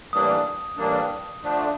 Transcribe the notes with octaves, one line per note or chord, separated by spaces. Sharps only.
A2 E3 G3 A#3 D4 D#6
A2 E3 G3 A#3 D4
D3 F3 A3 D4